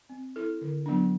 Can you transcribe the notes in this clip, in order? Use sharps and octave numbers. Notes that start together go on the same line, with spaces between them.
C4
E4 A4
D3
F#3 B3 D4